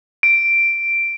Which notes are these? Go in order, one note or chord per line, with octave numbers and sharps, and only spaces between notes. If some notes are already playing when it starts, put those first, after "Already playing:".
D7